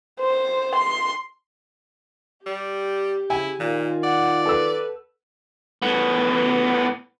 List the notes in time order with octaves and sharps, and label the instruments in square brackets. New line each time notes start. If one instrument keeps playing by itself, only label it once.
[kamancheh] C5
C6
[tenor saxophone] G3 [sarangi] G4
[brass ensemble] C#3 [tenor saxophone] E4 [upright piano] G#5
[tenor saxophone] A#2 [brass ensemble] D#3 F4
[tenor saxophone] D5 [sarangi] F#5
[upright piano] A4 E6 [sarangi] B4
[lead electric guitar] A2 B3